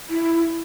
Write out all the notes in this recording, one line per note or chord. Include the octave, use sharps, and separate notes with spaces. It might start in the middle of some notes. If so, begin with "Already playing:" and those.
E4